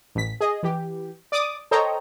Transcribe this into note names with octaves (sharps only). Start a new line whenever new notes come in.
A1 B6
G#4 D#5
E3 G4
D5 D6 D#6
A4 C5 C#5 D#5 G5 A#5